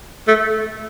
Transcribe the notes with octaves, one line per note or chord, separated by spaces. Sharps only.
A3